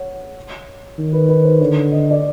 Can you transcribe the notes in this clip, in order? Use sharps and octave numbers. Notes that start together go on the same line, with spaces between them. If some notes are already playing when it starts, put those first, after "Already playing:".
Already playing: C#5 F#5
D#3
B4
B4
C5
D3 C#5
D#5
D5